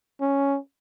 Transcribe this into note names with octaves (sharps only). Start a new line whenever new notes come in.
C#4